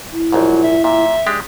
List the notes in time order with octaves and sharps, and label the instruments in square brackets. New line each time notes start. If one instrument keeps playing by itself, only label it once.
[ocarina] E4
[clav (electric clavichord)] A#1 G#2 [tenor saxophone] F#3
[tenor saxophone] E5
[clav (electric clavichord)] A#2 [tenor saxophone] E5
[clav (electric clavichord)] G#3 D4 G4